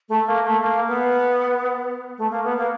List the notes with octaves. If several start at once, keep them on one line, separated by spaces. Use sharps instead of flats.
A3
A#3
A3
A#3
B3
A3
A#3
B3
A#3